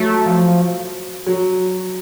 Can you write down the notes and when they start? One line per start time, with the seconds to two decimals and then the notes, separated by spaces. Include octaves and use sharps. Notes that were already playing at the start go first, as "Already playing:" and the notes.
Already playing: F#3 A3
0.26 F3
1.26 F#3